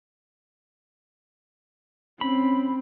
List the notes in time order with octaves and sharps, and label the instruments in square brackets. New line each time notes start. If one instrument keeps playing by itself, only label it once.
[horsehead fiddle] C4 [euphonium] C#4 [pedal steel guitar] B5